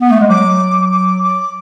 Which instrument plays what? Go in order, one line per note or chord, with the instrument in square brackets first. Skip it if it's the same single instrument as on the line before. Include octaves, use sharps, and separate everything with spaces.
[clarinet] B3
A3
G#3
[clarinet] F#3 [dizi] D6
[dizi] D6
D6